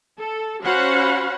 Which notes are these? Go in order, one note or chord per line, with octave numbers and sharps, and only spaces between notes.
A4
C#4 F#4 C5 F5 F#5 B5